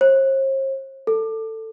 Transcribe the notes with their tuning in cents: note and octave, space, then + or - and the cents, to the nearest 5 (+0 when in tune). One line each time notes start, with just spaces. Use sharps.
C5 +45
A4 +15